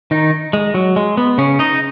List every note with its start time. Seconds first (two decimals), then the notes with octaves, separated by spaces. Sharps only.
0.11 D#3 D#4
0.53 G#3
0.74 F#3
0.96 G#3
1.17 B3
1.38 C#3 C#4
1.59 D#4 D#5